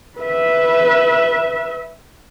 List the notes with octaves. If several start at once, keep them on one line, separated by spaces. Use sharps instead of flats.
B4 E5